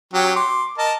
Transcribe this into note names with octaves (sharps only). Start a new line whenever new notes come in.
F#3 C#4 G4
C6 D6
A#4 D#5 A5